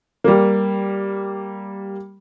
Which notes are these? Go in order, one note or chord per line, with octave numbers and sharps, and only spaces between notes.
G3 A#3